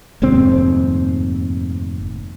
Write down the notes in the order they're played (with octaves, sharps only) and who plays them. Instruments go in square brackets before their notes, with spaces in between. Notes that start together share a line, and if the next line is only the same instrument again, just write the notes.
[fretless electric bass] F1 D#2 G#2 C4